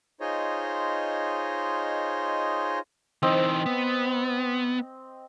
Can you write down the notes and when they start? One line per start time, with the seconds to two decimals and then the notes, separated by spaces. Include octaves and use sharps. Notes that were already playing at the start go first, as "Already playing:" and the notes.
0.21 D#4 F4 G#4 C5 C#5 D#5
3.23 E3 C4 D#4 D#5
3.66 B3